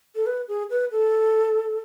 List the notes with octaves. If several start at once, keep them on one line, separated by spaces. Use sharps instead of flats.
A4
B4
G#4
B4
A4